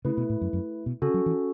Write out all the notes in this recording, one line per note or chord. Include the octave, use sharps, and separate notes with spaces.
C#3 A3 E4 B4
B2
A2
F#2
F#2
B2
C#3 C#4 F#4 A4
F#3
E3